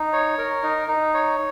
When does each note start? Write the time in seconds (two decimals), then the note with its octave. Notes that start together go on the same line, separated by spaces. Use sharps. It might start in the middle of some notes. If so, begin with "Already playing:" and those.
Already playing: D#4
0.13 C#5
0.38 A#4
0.63 D#4
0.88 D#4
1.14 C#5